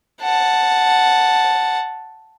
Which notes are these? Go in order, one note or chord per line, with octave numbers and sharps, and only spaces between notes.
F#5 A5